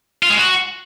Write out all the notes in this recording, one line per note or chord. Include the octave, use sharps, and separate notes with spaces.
F4
G#3
F#4